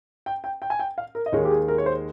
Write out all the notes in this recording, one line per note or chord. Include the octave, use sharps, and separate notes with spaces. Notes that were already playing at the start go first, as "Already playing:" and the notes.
G5
G5
G5
G#5
G5
F5
A#4
D#5
D#2 D#3 G#3 C#5
G4
G#4
A#4
C#5
C5